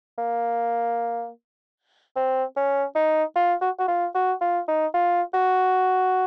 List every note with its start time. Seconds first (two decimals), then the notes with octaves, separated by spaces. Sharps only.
0.18 A#3
2.17 C4
2.57 C#4
2.96 D#4
3.36 F4
3.61 F#4
3.79 F#4
3.88 F4
4.15 F#4
4.41 F4
4.68 D#4
4.94 F4
5.34 F#4